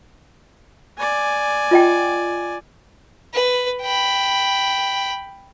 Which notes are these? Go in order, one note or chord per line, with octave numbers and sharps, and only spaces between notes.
D5 G#5
F4 D#5 G5
B4
G5 B5